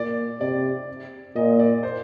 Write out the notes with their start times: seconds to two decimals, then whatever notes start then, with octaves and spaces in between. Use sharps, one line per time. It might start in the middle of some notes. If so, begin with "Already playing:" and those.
Already playing: A#2 D5
0.40 C3 D5
1.36 A#2 D#5
1.59 D5
1.83 C5